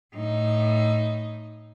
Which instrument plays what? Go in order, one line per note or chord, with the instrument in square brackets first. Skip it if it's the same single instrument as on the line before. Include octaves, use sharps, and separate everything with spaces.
[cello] A2 D#4